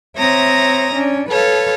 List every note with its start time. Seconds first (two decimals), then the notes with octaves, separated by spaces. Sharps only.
0.17 C4 C#5 E5 A#5 D#6 A#6
0.95 C#4 D4
1.30 A4 B4 C#5 F5